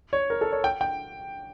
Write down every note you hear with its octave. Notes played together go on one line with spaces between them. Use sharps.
C#5
A#4
A4
C#5
G5
G5